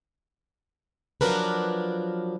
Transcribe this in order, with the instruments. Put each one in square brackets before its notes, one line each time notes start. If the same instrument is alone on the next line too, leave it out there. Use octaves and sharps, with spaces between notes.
[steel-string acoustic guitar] F3 F#3 D4 A#4 B4